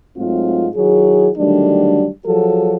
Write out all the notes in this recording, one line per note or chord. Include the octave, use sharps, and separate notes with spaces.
G#2 F#3 A3 C4 F4
D#3 F#3 E4 G#4
D3 D#3 F#3 G3 A3 D4
F3 F#3 F#4 G#4 A4